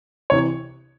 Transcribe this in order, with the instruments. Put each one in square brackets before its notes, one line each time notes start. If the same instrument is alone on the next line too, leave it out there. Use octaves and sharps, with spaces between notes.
[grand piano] C3 E3 C#5